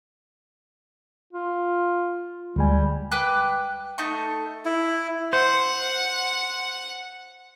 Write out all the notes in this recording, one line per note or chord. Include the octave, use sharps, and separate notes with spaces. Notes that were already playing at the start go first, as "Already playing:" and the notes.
F4
D2 G3 G#3 G#5
B4 G5 D6 F#6
A3 D#4 C#6
E4
C5 F#5